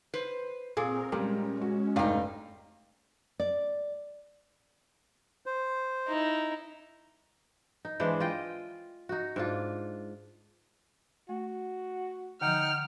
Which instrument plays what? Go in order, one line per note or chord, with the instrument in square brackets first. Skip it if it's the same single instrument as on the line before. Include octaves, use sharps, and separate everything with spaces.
[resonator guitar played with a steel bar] B4 C5
[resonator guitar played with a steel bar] A#2 [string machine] C4 A#4 [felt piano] G#4
[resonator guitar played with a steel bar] A#2 [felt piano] G3 G4 A#4 [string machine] G#3 C#4
[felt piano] F#4
[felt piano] F1 F5 G5 [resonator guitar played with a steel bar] G2 D#4
[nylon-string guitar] D5
[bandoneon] C5
[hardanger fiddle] D#4 E4
[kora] D#4
E3 G#3 D4 C5
F4 D#5 G5
D#4 F#4
G#2 D4 F4
[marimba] A3 [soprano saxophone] F#4
[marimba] D3 F3 [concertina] D#4 F#5 G5 [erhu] F6